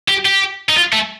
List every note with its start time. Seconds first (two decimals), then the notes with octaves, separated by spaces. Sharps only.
0.08 G4
0.25 G4
0.69 D#4
0.76 F4
0.93 A3